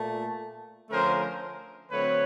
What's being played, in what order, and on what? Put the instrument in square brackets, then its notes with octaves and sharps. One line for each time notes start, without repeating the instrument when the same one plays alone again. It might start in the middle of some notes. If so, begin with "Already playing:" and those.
Already playing: [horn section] A#2 A3
D3 F3 A3 C#4 A#4 C5
D3 F#3 A3 C4 B4 C#5